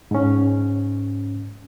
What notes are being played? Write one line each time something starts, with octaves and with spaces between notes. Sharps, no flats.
G#2 C#4